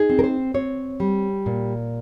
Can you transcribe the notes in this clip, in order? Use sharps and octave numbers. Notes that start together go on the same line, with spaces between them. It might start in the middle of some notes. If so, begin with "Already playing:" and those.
Already playing: D#4 G#4
C4
A#4
C5
C4 C#5
G3
A#2